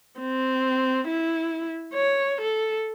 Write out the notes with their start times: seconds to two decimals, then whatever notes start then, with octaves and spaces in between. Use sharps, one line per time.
0.20 C4
1.08 E4
1.94 C#5
2.41 A4